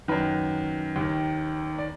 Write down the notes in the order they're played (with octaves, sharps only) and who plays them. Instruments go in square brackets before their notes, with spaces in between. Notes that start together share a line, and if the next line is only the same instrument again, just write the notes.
[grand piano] F#2 D#3 B4
D#2
D#3
D5